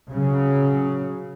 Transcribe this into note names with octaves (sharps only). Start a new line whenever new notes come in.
C#3 F#3